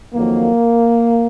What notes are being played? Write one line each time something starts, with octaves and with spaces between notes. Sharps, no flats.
F2 D#3 F#3 A#3